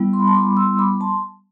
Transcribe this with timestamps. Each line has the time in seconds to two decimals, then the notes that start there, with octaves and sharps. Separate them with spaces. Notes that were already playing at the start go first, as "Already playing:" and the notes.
Already playing: G3 B3 E4
0.13 C6
0.20 B5
0.27 A5 C6
0.35 B5 D6
0.57 C6 E6
0.79 B5 D6
1.01 A5 C6